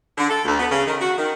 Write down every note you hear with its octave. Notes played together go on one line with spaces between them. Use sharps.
D3
A4
D2
B3
C#3
D#3
F#4
D#3